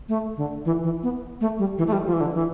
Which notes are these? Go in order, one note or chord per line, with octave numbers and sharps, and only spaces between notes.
A3
D3
E3
E3
B3
A3
G3
E3
A3
G3
F3
E3
D3
E3